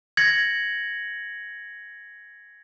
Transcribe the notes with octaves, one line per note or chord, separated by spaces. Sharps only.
G#6 A#6 C#7 F#7